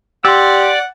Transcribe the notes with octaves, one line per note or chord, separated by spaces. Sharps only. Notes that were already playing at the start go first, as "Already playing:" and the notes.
G4 D5 F#5 C6 E6